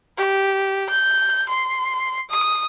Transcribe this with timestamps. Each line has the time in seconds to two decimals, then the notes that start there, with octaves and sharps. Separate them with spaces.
0.17 G4
0.90 G6
1.49 C6
2.30 D#6